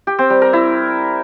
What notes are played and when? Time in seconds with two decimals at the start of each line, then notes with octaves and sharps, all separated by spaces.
0.07 G4
0.19 C4
0.30 G3
0.42 A#4
0.53 E4